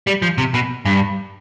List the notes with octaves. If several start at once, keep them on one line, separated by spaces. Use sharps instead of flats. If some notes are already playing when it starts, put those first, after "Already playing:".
G3
F3
C3
B2
G2